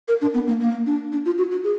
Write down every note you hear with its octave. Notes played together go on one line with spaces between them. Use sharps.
A#4
D4
B3
A#3
A#3
D4
D4
F4
F#4
F#4
G#4